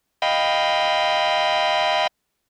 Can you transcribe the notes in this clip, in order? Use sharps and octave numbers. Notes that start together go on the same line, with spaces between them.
D#5 F5 G5 B5